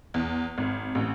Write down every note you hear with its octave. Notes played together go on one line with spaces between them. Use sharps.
E2
G#1
A1